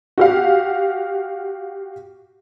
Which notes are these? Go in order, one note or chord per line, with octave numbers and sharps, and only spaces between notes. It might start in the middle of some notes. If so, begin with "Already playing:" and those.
F#4 G4 F5